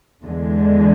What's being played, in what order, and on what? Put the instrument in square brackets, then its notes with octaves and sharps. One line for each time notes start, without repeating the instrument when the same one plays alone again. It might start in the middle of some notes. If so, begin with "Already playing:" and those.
[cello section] E2 D3 G#3